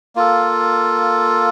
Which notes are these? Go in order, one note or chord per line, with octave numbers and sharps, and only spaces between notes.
A#3 F4 A4